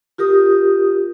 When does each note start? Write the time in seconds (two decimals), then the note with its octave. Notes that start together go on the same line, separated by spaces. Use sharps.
0.18 F4 G4 A#4 D#6